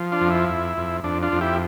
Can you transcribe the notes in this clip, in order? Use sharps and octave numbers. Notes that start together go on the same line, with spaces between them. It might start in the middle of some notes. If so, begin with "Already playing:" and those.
Already playing: F3
D4 F4
F2
E4
F2
F2
F2 D4
D4 F4
F2
E4 G4